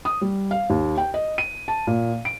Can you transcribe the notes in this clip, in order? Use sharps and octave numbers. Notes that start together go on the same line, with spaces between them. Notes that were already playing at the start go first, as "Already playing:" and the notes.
D#6
G3
F5
D#2
G5
D#5
D#7
A5
A#2
D7